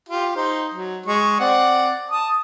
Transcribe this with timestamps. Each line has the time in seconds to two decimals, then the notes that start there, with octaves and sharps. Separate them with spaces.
0.09 F4 G4
0.36 D#4 C5
0.74 F#3
1.06 G#3 C#6
1.40 C4 D5 F#5
2.11 A5 D#6